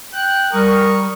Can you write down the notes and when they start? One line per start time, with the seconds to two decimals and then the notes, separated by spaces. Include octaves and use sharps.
0.14 G5 F#6
0.53 G3 A#4 C#6 D#6